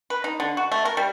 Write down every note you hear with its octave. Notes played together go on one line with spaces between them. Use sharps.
B4
D#4
D3
F#4
A3
A#4
G3